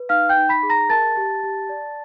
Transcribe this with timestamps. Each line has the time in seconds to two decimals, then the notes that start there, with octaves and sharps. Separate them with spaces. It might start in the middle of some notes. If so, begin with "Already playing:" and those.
Already playing: B4
0.09 D#4 F5 F6
0.29 G5 G6
0.37 D#4
0.49 B5 B6
0.63 G#4
0.70 A#5 A#6
0.89 A#4 A5 A6
1.17 G4
1.43 G4
1.69 D5